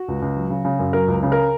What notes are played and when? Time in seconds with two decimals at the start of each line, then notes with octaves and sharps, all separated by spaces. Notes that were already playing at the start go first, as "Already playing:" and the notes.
Already playing: F#4
0.08 C#2
0.22 C#2
0.36 F#3
0.50 C#3
0.65 C#3
0.79 F#2
0.93 F#3 A#4
1.08 C#2
1.23 C#3
1.32 A#4